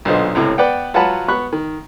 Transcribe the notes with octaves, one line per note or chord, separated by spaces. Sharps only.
B1 A#2 D3 B3 C5 D#5
C#2 A2 C3
B3 B4 D5 F#5 G5
F#3 F4 B4 F#5 A5 B5
B3 B5 C#6 F#6
D#3